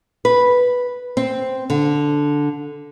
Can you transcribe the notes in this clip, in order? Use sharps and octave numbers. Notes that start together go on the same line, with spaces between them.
B4
C4
D3